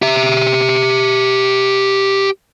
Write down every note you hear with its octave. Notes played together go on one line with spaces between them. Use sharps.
G4 E5